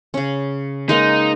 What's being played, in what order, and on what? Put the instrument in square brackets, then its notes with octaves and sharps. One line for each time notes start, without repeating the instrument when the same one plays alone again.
[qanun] C#3 C#4
[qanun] G#3 A#3 B4 [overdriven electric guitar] D#4